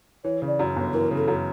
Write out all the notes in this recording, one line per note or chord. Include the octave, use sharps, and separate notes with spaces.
E3 C#5
C#3
D5
F#2
G1
E3 A#4
C#3
A4
F#2